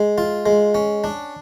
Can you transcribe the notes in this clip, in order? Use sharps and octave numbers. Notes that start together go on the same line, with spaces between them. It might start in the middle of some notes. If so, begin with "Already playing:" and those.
Already playing: G#3
F4
G#3
C#4
D4